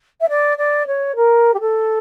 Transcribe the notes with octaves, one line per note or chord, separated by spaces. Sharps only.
E5
D5
D5
C#5
A#4
G4
A4